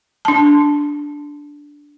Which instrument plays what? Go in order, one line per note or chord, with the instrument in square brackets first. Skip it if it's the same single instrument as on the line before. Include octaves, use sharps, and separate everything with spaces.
[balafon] D4 A5